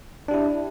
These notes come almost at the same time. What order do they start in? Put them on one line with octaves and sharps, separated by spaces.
D4 G4 E4